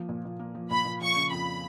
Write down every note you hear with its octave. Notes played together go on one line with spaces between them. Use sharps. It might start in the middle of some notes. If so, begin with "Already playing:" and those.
Already playing: F3 A#3
A#2
A#2
A#3
F3
A#2 B5
A#2
F3 C#6
C#3
F2 B5